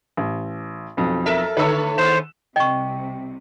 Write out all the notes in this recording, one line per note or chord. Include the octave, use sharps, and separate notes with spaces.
A1
B1 F2
A4 A#4 E5
D3 A3 B4 C#5 E6
D#2 B3 C5 E7
C2 C3 D#5 G5 C#6